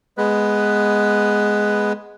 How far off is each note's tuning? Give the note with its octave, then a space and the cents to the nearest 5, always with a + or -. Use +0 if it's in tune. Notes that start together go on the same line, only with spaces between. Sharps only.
G#3 +0 B3 +0 B4 +0